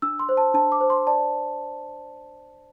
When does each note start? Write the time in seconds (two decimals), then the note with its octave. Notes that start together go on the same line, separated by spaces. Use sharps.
0.02 D4 E6
0.19 C6
0.29 C5
0.37 A5
0.54 D4 A5
0.72 D6
0.81 C5
0.90 C6
1.07 D5 A5